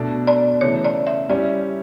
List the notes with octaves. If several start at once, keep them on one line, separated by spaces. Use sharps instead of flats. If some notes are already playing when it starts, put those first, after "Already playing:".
Already playing: B2 A3 D4 A4
D5
C#3 E3 A3 C#5
D5
E5
G3 C#4 E4 G4 D5